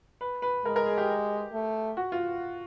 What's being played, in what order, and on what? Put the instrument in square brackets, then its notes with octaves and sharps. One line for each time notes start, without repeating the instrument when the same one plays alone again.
[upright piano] B4
B4
[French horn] G#3 [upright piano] A#4
[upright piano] A#4
G#4
G4
[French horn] A3
[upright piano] F#4
F4